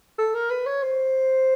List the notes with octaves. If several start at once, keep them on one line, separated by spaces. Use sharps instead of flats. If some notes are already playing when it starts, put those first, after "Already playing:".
A4
A#4
B4
C#5
C5